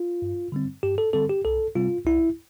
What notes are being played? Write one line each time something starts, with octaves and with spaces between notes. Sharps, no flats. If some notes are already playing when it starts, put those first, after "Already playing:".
Already playing: F4
G2
D3 G3 C4
G2 G4
A4
D3 G3 C4 A4
G4
C2 A4
C3 G3 C4 F4
C2 E4